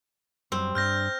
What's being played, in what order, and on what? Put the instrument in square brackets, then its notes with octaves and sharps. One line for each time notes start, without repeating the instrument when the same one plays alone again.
[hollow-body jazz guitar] F#2 G3 [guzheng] C4
[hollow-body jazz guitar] G2 D4 [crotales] F6 G6 A#6